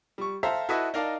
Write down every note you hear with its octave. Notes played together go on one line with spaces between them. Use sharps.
G3 C#6
A4 C5 E5 F5 A#5
E4 F#4 A4 B4 D#5 E5
D#4 A#4 D5 F5 A5